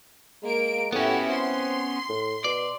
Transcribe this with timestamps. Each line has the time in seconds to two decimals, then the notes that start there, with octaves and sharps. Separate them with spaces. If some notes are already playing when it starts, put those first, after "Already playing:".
0.43 G#3 A#3 D7
0.92 A2 B3 C#4 E4 F#4 G4
1.30 C4 C6
2.09 A2
2.44 B2 D5